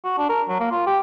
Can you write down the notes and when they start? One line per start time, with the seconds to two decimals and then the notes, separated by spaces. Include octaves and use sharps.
0.04 F#4
0.18 D4
0.29 A#4
0.48 F#3
0.60 A#3
0.71 F4
0.86 G4